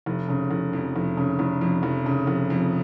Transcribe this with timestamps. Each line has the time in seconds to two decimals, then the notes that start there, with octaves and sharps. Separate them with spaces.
0.06 F1
0.29 C#3
0.50 F1
0.73 F2
0.96 F1
1.17 C#3
1.39 F1
1.61 F2
1.83 F1
2.06 C#3
2.27 F1
2.50 F2